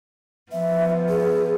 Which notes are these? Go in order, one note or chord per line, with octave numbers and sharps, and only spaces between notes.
F3 B3 E5
G#4